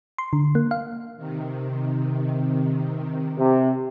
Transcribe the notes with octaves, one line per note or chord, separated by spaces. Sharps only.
C6
D3
A#3
F5
C3 D#3
C3